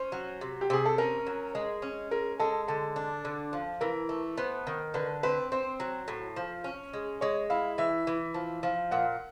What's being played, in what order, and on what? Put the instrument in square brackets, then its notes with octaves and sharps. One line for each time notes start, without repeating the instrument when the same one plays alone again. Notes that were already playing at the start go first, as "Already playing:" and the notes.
Already playing: [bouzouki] C#4 [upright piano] C5
[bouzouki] F#3
C3
[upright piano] G4
[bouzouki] C3 [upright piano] G#4
[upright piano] A4
[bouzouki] C#4 [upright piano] A#4
[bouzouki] F#3
G#3
C#4
[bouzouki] G#3 [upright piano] A#4
[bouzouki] G#3 [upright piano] A4
[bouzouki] D3 [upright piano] A4
[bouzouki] D4
D3
F3
[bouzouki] E3 [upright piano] A#4
[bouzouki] A3
[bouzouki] B3 [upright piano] C5
[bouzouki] D#3
[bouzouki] D3 [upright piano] B4
[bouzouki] C4 [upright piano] B4
[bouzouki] C4 [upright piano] C5
[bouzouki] F#3
A2
F3
C#4
G#3
[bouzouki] G#3 [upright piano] C#5
[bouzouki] E4 [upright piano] F5
[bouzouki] E3 [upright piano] E5
[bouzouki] E3
F3
F3
[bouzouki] A#2 [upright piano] F#5